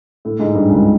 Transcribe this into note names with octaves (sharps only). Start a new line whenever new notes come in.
A2 A3
G#2 G#3
G2 G3
C#2 C#3